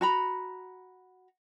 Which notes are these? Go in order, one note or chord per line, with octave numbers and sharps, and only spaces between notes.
F#4 A#5 B5